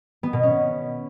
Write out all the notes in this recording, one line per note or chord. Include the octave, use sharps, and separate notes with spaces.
B3
B2
C#4